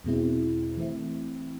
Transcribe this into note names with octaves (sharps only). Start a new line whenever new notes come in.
E2 B2 G#3 C4 E4
E3 A3 C4 E4